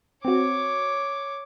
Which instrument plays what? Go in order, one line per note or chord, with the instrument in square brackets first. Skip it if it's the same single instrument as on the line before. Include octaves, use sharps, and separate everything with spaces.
[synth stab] C4 F#4 [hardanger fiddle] C#5 D6